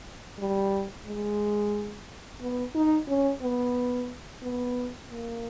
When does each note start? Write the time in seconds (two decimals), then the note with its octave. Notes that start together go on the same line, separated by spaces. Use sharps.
0.39 G3
1.06 G#3
2.41 B3
2.75 D#4
3.08 C#4
3.42 B3
4.43 B3
5.10 A#3